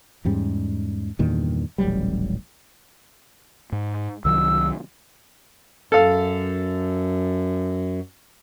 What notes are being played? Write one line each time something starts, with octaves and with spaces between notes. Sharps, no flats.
E2 G#2 G3 C#4
E2 G2 A#2 D#3
D#1 A1 F#3 G3
G#2
C2 D#3 F#3 E6
F#2 A4 F5